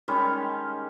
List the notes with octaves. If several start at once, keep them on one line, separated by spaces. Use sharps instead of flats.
D#3 G3 G#3 C#4